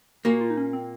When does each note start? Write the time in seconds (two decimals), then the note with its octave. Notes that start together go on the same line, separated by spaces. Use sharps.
0.25 A#2 A#3 F#4
0.41 F4
0.50 D#4
0.57 C#4
0.73 C4